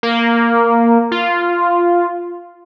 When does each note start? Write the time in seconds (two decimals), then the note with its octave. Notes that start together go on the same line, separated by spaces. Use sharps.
0.03 A#3
1.12 F4